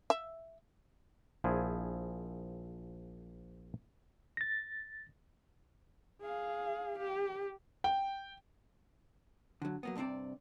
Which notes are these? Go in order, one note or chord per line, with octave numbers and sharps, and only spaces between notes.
E5
A#1 F3 E4 G#4 G#5
A6 A#6
G#4 F5
G4
G5
D3 F#3
F#3 A#3 B3
G2 C3 E3 C4 D5